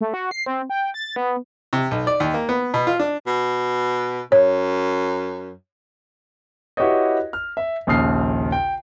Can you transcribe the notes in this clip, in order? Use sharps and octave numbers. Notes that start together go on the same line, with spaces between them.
A3
F#4
C7
C4
G5
A6
B3
C3
B1
D5
D#2
A#3
B3
B2
F4
D4
B2
F#2 C#5
E4 F#4 G4 B4 C#5 D#5
F6
E5
A#1 D#2 C#3 D#6 F6 C7
G5